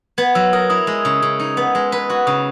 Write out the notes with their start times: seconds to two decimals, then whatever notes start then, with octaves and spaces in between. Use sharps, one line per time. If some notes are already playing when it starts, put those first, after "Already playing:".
0.18 B3 G#6
0.35 F#3 E6
0.53 A#4 D#6
0.70 E4 D#6
0.87 G#3
1.05 C#3
1.22 C#3
1.40 D#4
1.57 B3
1.75 G#3
1.92 B4
2.10 F#4
2.27 C#3 D#6